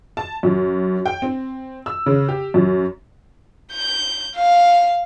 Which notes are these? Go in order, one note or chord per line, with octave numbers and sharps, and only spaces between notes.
A5
F#2
G5
C4
E6
C#3
G4
F#2
G6
F5